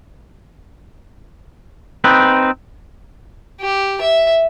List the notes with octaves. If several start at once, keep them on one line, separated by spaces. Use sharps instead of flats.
C4 D#4 B4
G4
E5